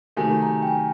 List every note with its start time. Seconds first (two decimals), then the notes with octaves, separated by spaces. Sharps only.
0.17 C3 D#3 F#3 A3 G#5
0.42 A#5
0.62 G5
0.67 G#5